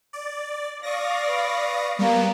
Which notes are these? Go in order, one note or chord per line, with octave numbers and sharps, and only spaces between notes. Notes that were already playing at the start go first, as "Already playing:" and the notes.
D5
D5 F5 C#6 D#6 A#6
B4
G3 A#3 B3